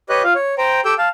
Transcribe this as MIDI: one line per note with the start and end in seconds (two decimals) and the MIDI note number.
0.09 0.22 67
0.09 0.22 71
0.09 0.22 73
0.09 0.22 75
0.09 0.22 90
0.24 0.33 65
0.24 0.33 77
0.35 0.55 73
0.58 0.81 72
0.58 0.81 79
0.58 0.81 82
0.85 0.94 67
0.85 0.94 69
0.85 0.94 79
0.85 0.94 88
0.85 0.94 91
0.98 1.09 77
0.98 1.09 81